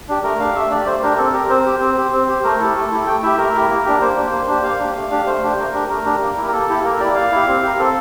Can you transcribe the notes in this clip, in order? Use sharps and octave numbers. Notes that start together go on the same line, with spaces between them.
D4 G4
A3 A#4
D4 G4 F5
A3 E5
D4 G4 D5
A3 C5
D4 G4 A#4
C4 A4
G4 A#4
C4 C5
G4
C4
G4
C4
G4
A3 A#4
E4 G4 A4
A3
E4 G4
A3 G5
E4 G4 E5
A3 A#4
E4 G4
A#3
D4 G4
A#3 C5
D4 G4
A#3
D4 G4
A#3 F5
D4 G4
A3
D4 G4
A3 C5
D4 G4
A3 A#4
D4 G4
A3 A#4
D4 G4
A#3
E4 G4
A#4
A#3 A4
E4 G4
A#3 A#4
E4 G4 D5
A#3 F5
E4 G4
C4
G4 A#4
C4 A4